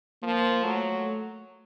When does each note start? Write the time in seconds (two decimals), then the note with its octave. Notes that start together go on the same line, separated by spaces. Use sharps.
0.22 F3 A#3
0.63 F#3 A3